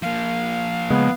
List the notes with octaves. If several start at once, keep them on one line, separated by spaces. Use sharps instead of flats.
F3 A#3 F5
C#3 G#3 B3